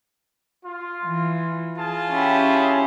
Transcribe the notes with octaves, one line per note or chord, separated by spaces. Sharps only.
F4
E3
F4 G#4 A5
C#4 E4 G4